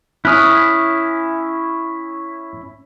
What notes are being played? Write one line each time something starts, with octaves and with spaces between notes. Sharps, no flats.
C#4 E4 D#6 F6 F#6